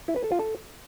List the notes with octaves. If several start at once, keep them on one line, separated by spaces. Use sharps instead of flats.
E4
B4
A4
F4
A4